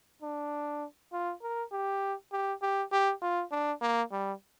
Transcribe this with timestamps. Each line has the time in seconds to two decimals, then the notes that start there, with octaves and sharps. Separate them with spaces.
0.22 D4
1.12 F4
1.42 A#4
1.72 G4
2.32 G4
2.62 G4
2.92 G4
3.22 F4
3.51 D4
3.82 A#3
4.12 G3